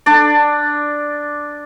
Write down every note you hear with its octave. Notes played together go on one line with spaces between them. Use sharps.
D4 D5